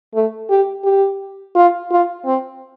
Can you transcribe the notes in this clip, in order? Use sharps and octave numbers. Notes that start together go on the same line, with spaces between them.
A3
G4
G4
F4
F4
C4